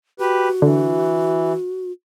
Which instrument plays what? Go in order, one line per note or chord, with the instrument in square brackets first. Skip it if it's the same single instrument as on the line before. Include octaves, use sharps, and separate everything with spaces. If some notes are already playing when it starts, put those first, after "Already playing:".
[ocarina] F#4 [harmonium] G4 B4
[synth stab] D3 [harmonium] E3